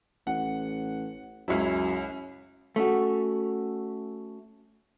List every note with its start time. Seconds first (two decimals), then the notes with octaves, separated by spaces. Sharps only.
0.27 A1 F#5
1.48 C#2 F#2 C#4 E4
2.76 A3 C#4 F#4